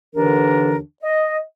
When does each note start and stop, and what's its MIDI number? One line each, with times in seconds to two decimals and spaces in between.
0.15 0.78 39
0.15 0.78 50
0.15 0.78 52
0.15 0.78 62
0.15 0.78 70
1.03 1.38 75